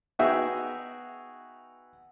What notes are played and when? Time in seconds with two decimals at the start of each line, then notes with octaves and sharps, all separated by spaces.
0.19 B3 D#4 F#4 G#4 E5 G5